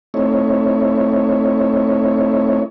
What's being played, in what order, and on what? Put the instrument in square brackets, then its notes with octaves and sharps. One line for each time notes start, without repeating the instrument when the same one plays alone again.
[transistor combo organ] A3 C4 D#4 E4 C#5